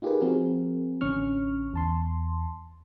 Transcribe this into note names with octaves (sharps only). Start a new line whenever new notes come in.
D#4 F4 G4 G#4 A#4 B4
F3 C4 F#4 G#4 A#4
A1 D3 C#4 C#6 F6
E2 A5 C6